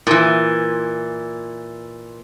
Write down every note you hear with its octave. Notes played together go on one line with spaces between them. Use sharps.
A#2 E3